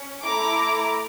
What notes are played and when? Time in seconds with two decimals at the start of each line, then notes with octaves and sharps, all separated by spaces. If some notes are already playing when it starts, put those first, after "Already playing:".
Already playing: C#4
0.25 A3 E4 A4 A#5 D6